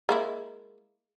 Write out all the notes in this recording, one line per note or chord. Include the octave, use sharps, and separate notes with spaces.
G#3 A#3 E4